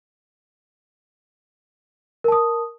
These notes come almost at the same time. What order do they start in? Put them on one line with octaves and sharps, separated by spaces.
A#4 A5 D#6